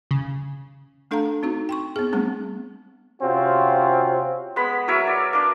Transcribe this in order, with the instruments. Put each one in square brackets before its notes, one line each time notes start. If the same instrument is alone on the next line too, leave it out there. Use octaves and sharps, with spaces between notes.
[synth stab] C#3
[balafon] A3 D4 A4 F5 A5 A#5
C4 D#4 F#4
G5 C6 C#6
B3 G#4
G3 A3 B3 C4 D4 G#4
[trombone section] C3 C4 C#4 F4 F#4
[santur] G#3 B3 B5
F#3 A#4 C#5 E5
D5
A#3 D4